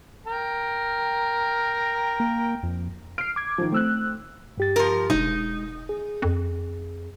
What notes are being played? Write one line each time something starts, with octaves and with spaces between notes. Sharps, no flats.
A#4 G5
A#3
F2
F6 C7 D7
D6 G#6
D#3 F3
A3 C4 E6 F#6
G2 G4 A6
F3 A#4
E1 G#3 D#4
G#4
F2